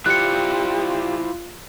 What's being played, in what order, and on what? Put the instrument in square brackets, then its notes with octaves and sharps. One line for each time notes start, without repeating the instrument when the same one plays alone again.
[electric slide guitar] E4 C5 D5 [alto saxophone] F4 [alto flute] G4 [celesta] F#6 C#7